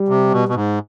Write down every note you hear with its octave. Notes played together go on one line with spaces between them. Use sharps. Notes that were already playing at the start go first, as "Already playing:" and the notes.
Already playing: G3
C3
B2
B2
G#2